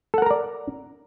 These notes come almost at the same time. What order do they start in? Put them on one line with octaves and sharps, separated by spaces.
A4 F#5 A#4 A#5 D5